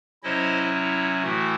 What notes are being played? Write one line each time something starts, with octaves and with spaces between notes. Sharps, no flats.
C3 F#3 C#4 E4 C5 D#5
E4
A2 E3 A3 F#4